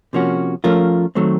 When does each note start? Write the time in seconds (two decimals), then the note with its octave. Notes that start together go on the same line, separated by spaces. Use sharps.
0.13 C3 F3 A#3 C#4 F#4
0.64 F3 A3 C#4 F4 A#4
1.15 D#3 F#3 A3 C4